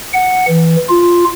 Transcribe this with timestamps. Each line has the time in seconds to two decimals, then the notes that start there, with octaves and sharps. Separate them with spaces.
0.14 F#5
0.47 E3
0.89 F4